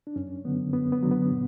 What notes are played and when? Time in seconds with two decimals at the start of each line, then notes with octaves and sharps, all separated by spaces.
0.07 D4
0.16 F#2 C#4
0.45 D3 F#3 B3
0.73 F#2 B3
0.92 B3
1.02 D3 F#3
1.11 B3
1.30 A#2